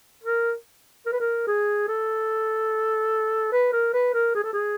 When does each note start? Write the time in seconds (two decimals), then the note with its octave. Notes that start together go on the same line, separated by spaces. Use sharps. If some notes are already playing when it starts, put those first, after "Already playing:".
0.24 A#4
1.06 A#4
1.13 B4
1.20 A#4
1.47 G#4
1.88 A4
3.52 B4
3.73 A#4
3.94 B4
4.14 A#4
4.35 G#4
4.44 A4
4.53 G#4